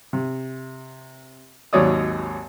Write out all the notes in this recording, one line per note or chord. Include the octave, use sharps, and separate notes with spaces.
C3
G#1 D#2 F#3 C#5 D5 D#6